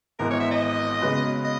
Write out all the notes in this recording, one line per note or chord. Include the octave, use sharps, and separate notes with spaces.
G#1 G#2 E3 B3 A#4
C#5
E5
D#5
C#3 G#3 B3 F#4 B4
D#5